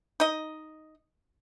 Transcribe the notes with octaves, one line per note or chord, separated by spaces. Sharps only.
D#4 D#5